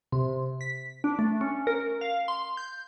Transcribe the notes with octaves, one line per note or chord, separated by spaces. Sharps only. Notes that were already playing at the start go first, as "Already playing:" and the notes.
C3
B6
D4
A3
C#4
A#4
F5
C6
G6